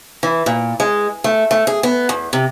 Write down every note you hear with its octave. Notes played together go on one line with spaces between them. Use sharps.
E3
A#2
G#3
A3
A3
G#4
B3
E2
C3